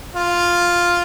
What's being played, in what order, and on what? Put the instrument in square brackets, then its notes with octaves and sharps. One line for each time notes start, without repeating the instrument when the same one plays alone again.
[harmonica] F4